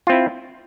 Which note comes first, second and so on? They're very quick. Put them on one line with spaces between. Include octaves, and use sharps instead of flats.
F4 C4 E4